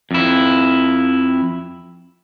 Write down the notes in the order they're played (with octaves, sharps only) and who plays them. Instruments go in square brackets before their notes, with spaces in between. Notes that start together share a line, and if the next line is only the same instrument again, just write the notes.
[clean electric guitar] F2 E4